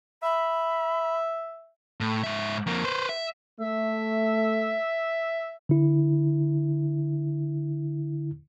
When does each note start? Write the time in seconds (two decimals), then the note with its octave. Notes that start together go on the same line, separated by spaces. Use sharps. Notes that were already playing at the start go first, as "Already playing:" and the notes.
0.23 E5 B5
2.00 A2
2.24 G#2 E5
2.66 F2 A#3
2.85 B4 C5
3.09 E5
3.61 A3 E5
5.69 D3 E4